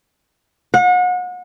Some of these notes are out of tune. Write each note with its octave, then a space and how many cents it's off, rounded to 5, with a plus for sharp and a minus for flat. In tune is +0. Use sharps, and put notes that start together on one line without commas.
F#5 -35